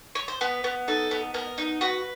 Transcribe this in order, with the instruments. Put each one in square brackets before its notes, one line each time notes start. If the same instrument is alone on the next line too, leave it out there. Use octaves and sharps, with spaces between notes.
[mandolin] C#5
C5
B3 B4
B3
D#4 A4
B3
B3 A#4
D#4
F#4 B4